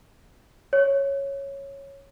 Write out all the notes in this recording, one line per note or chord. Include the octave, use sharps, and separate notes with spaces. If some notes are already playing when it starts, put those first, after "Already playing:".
C#5